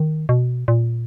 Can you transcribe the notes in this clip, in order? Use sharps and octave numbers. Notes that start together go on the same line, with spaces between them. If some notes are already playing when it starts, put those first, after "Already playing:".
Already playing: D#3
B2
A#2